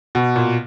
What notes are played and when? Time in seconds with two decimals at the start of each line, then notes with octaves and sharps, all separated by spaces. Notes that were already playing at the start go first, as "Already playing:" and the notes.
0.15 B2
0.36 A#2